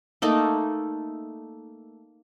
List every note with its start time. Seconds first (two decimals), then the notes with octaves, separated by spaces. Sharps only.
0.22 A3 A#3 D#4